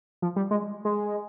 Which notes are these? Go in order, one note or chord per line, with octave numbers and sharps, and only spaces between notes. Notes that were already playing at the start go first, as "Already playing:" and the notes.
F3
G3
G#3
G#3